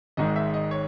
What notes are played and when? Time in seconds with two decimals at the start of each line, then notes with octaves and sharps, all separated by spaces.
0.17 G#1 G#2 D#3 G#3 D#5
0.36 E5
0.54 D#5
0.71 C#5